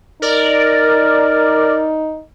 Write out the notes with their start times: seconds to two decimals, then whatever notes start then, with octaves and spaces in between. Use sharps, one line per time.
0.22 D#4 A#4 D5